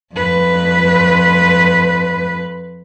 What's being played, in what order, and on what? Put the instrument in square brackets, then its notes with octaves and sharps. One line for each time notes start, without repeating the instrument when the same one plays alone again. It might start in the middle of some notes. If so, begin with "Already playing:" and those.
[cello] F2 B4